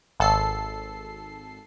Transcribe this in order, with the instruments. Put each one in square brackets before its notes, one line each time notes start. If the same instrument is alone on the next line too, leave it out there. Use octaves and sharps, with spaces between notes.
[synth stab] G#1 A4 C7